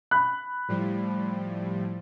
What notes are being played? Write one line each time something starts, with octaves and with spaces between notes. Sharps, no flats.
B5 F#6
A2 F3 G3